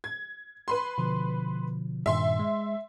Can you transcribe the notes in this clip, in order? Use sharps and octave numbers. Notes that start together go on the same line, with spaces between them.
G#6
B4 B5 C6
B2 D3 F3
G2 A#2 D#3 E5 C6
G#3